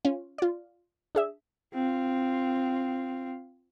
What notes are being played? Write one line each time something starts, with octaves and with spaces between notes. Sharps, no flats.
C#4 F4
F4 D5
D4 G#4 E5
C4 F4